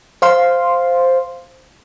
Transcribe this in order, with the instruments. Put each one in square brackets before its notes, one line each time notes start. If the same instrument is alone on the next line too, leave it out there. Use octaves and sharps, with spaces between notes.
[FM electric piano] C5 F5 C6